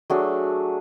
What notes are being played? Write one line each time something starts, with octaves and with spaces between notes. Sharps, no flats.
F#3 A3 D4 G#4